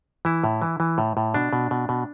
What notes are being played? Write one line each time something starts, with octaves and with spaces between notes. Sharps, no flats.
E3 E4
A2
E3
E3
A2
A2
B2 D4
B2
B2
B2